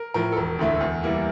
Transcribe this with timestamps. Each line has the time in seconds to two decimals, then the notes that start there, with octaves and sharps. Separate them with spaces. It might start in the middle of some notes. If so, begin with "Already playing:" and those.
Already playing: A#4
0.14 A2 F3 A#4
0.32 A4
0.37 E1 A#4
0.59 D2 D3 A3 E4
0.81 E2
1.03 E3 G3 A#3 E4